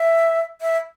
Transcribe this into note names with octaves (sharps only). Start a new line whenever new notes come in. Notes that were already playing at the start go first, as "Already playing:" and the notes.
Already playing: E5
E5